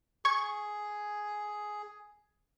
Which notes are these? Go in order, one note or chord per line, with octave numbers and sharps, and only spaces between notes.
G#4 C#6 G#6